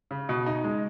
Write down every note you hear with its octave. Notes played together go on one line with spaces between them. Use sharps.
C#3
B2
D#4
G#3